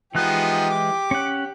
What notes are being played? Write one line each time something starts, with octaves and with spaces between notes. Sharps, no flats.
E3 F3 G#3 B3 D#4 G4 F#6
D6
C#4 F#5